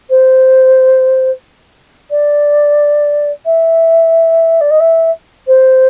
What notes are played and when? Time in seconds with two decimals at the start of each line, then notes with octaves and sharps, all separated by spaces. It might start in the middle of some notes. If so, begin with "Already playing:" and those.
0.09 C5
2.10 D5
3.45 E5
4.60 D5
4.70 D#5
4.79 E5
5.47 C5